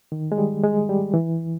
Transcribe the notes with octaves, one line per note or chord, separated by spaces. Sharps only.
D#3
G#3
G3
G#3
G3
E3